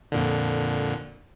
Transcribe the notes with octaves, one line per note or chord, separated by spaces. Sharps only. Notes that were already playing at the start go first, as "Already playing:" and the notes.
F2 A#2 D3